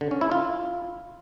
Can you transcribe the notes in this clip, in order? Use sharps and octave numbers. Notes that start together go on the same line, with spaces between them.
D3
C#4
E4
F4